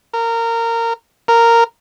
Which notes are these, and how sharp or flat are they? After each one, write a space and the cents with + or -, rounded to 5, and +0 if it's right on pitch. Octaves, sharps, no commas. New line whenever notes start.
A#4 -20
A#4 -10